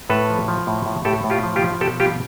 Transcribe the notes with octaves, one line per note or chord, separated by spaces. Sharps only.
A2 A4 B4
F3
F3
A2
A2
A2 G4 A4
A2
F4 G4
F3
F4 G4
F3
B2 G4 A4
G3 F4 G4